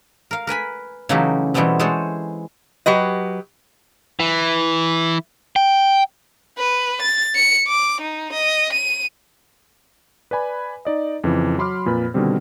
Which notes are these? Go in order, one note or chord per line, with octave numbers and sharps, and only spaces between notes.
A#4 F5
A#4 B4 G#5 B5
C#3 E3 F#3 A3 D#4 G4
B2 E3 G3 A3 B3 C4
G#3 G#4 A4 C5 C#5 F#5
F#3 G4 B4 D#5
E3
G5
B4
A6
C#7
D6
D#4
D#5
D#7
B4 D5 G#5 B5
D#4 D5 D#5
F2 C#3 E3
F#3 B5 C6 D6 F6
F2 A#2 B4 B5
B2 D3 D#3 G3 C4